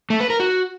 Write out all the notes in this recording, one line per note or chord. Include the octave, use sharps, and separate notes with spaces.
A3
B4
A#4
F#4